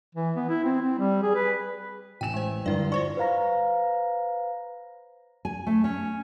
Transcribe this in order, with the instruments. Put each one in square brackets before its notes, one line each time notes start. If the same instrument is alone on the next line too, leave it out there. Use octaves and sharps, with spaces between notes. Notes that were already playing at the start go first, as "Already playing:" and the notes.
[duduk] E3
B3
E4
C4
C4
G3
G#4
B4
[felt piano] A1 E7 [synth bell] G5 G#5
[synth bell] G#3 C5
[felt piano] G2 [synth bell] D3 E4 D5
[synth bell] F4 C5 D5 [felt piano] C#6
[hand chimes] B4 C5 F5 A#5 A#6
[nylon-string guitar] G#5
A3
C#4